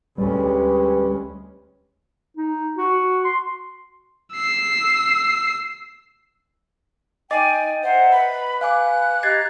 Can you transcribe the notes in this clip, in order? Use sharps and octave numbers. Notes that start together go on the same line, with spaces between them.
D2 G3 G#3 C#4 G4 B4
D#4
F#4
C6
E6 C7
D#4 D#5 G5 G#5 D6 A6
C5 E5 F#5 A#5
B4 B5
F5 G#5 D6 F#6
G4 D#5 A#5 G#6 A6 C7